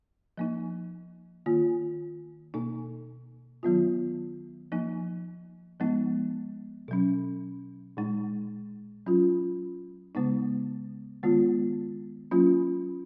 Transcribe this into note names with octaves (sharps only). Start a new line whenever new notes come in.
F3 A#3 D#4
D#3 A#3 F4
B2 A#3 D#4
D#3 F#3 B3 F4
F3 A#3 D#4
F3 G#3 B3 D#4
B2 F#3 C#4
A#2 G#3 D#4
F#3 C#4 F4
C#3 G#3 B3 D#4
D#3 G#3 B3 F4
F#3 A#3 C#4 F4